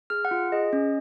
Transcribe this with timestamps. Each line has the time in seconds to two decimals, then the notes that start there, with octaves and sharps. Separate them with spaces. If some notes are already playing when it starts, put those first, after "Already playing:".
0.10 G#4 F6
0.25 F#5
0.31 F4
0.52 G#4 D#5
0.73 C#4